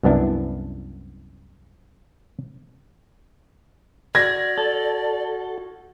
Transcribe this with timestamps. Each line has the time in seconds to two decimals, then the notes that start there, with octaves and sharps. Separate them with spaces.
0.03 C2 F#2 B3 D4 E4
4.15 F#4 D5 G#6 A#6
4.58 A4